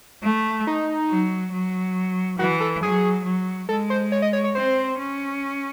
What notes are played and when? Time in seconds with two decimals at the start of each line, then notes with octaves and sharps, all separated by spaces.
0.23 A3
0.67 D#4
1.10 F#3
1.53 F#3
2.39 E3 F#4
2.61 A4
2.83 F#3 G#4
3.25 F#3
3.68 G#3 A4
3.90 C5
4.12 C#5
4.22 D#5
4.33 C#5
4.44 C#5
4.55 C4 C5
4.98 C#4